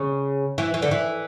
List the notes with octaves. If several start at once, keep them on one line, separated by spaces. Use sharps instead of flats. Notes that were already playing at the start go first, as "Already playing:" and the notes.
Already playing: C#3
E3
E3
D3
E3